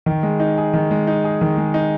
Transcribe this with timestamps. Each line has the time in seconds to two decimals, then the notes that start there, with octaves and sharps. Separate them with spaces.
0.06 D#3
0.23 G#3
0.40 D#4
0.57 G#4
0.74 D#3
0.91 G#3
1.07 D#4
1.24 G#4
1.41 D#3
1.57 G#3
1.74 D#4